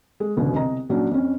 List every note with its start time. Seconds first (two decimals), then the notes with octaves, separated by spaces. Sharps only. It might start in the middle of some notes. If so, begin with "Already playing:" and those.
0.20 G#3
0.37 E1 C#2 B2 D3
0.55 C2 D#5 A#5
0.89 A#1 F#3 C#4 D4
1.11 F2 C#4